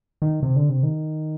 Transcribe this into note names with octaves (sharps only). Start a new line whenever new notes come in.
D#3
C3
D3
C3
D#3